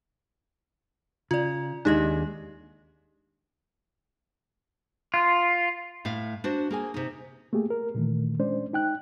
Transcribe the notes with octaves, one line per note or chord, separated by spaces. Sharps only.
C#3 F4 D5
D#2 G#3 D4 D#4 G4 D#5
F4
A2 A3 F5
D4 F#4 C5
A#3 G#4 G#5
C3 D#4
A3 A#3 G4 G#4
A#4
A#2 D#3 E3 A3
G#3 C#4 D4 C5 D5
D#4 G5 F#6